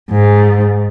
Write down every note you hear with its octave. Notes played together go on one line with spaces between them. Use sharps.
G#2